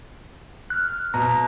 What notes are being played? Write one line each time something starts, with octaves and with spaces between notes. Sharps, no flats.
F6 F#6
B2 A#5